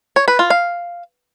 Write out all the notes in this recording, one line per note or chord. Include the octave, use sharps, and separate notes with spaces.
C#5
B4
F4
F5